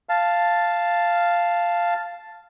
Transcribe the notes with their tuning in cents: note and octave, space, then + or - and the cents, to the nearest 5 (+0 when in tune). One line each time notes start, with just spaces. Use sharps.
F5 -5 A5 +0